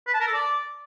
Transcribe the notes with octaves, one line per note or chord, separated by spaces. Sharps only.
B4
A5
A#4
A4
D5